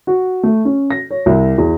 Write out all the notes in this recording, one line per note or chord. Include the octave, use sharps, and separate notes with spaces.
F#4
A3
C#4
A#6
C#5
C2
E2